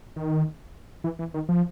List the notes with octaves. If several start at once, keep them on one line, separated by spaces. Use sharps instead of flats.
D#3
E3
E3
D#3
F3